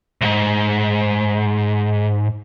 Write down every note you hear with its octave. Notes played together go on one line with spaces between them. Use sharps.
C2 G#2